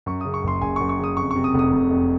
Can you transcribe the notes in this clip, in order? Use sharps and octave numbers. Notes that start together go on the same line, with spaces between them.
F#2 C#6
C#3 D#6
C#6
F#1 C6
F#1 G#5
C#6
F#2
C#6
C#3 D#6
F2 C#6
C#6
C3
D#6
F1
D#6
F1
F2